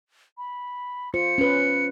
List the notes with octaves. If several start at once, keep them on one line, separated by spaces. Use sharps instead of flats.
B5
F4 C5 C#7
C#4 B4